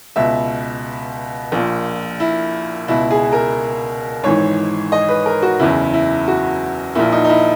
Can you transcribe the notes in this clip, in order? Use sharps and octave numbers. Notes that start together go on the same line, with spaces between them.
C#2 B2 E5
A#1 A#2
E4
C#2 B2 E4
G#4
A#4
G#1 G#2 E3 C#5
D#5
B4
A#4
F#4
F#1 E2 C#3 E4
E4
F#4
A#1 A#2 E4
D#4
D#4
E4